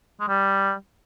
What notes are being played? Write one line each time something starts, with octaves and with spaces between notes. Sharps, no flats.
G#3
G3